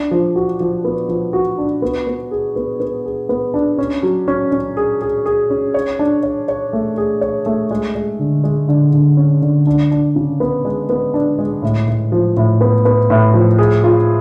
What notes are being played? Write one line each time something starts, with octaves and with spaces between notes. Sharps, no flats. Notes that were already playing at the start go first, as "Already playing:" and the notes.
Already playing: D4
F3
F#4
F3
B3
F3
F#4
D4
B3
B3
G#4
B3
B3
G#4
B3
D4
C#4
F#3
C#4
C#4
G#4
G#4
G#4
C#4
C#5
D4
C#5
C#5
A3
G#4
C#5
A3
G#3
G#3
D3
G#3
D3
D3
C#4
D3
D4
D4
C#3
B3
G#3
B3
D4
G#3
A2
A2
F3
A2
B3
B3
A2
F3
G#4
F4